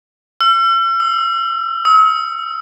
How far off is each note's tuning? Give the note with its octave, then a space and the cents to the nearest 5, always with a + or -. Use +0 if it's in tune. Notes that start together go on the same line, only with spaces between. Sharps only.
E6 +45
E6 -10
E6 -45